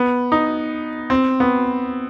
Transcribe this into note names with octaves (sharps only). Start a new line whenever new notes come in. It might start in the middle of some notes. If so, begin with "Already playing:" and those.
Already playing: B3
D#4
C4
B3